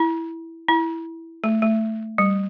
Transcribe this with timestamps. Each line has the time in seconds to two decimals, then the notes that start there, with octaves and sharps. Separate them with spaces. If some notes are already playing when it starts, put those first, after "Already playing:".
Already playing: E4
0.68 E4
1.44 A3
1.62 A3
2.18 G3